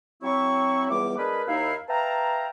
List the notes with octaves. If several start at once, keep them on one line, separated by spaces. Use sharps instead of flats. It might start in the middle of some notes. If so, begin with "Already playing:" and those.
F#3 C4 E4 C#6
C#2 E3 G3 B3 D6
G#3 D4 G#4 A#4 B4
D#2 D#4 E4 F5
B4 E5 F5 G5 A5 A#5